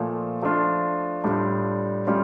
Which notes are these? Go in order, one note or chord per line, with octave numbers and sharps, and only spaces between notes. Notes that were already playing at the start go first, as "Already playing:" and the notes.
Already playing: A#2 F3 A3
F3 A3 D4 F4
A2 G3 D4 F4
A2 G3 C#4 F4